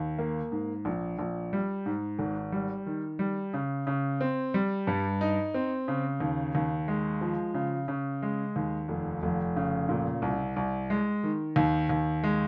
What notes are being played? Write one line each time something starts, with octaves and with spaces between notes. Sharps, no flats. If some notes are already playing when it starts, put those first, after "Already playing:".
Already playing: D#2
A#3
G#2
A#1
A#1
G3
G#2
G#1
G3
D#3
G3
C#3
C#3
C4
G3
G2
D#4
C4
C#3
D#2
D#2
G#3
F3
C#3
C#3
G#3
D#2
F1
F1
C#3
A#2
C2
C2
G#3
D#3
D#2
D#2
G#3